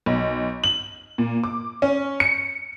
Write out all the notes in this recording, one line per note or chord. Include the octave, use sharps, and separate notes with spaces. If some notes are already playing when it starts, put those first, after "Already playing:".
B1
F#7
A#2
D6
C#4
C#7